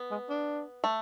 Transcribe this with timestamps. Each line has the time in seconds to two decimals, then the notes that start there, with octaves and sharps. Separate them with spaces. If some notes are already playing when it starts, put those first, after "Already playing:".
Already playing: B3
0.11 G#3
0.29 D4
0.84 A3